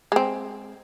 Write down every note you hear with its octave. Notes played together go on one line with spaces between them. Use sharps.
G#3 C4